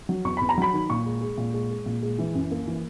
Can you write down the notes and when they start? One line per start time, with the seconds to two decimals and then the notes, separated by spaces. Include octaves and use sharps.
0.09 F#3
0.25 E2 C#6
0.37 E2 B5
0.49 A#5
0.58 F#3 B5
0.73 D#3
0.90 A#2 C#6
1.06 G#3
1.21 G#3
1.38 A#2
1.54 G#3
1.71 G#3
1.86 A#2
2.02 G#3
2.19 E3
2.35 F#2
2.51 A#3
2.67 E3